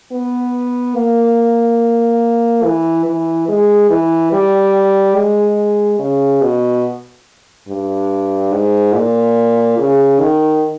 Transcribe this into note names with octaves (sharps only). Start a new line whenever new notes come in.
B3
A#3
E3
E3
G#3
E3
G3
G#3
C#3
B2
G2
G#2
A#2
C#3
D#3